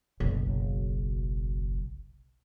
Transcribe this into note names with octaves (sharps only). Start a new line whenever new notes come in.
F#1 B1